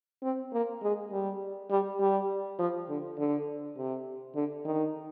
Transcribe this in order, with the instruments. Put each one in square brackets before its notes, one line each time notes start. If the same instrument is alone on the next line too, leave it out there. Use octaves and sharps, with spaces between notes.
[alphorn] C4
A#3
G#3
G3
G3
G3
F3
D3
D3
C3
D3
D#3